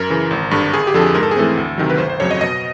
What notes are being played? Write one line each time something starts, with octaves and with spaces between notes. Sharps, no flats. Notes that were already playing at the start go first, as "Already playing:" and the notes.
Already playing: F#2 A#4
C#3 E3
G#1
G2 D3
G1 G#4
G4
F2 D3 F3 A4
G#4
G#2 A#4
A4
G#4
E3 A3 C4 A4
D2
C3 D#3 F#3
B4
G1 C5
C5
F2 C#3 F#3 C#5
D#5
B2 D#5